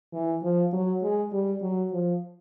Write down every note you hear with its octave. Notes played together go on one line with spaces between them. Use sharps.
E3
F3
F#3
G#3
G3
F#3
F3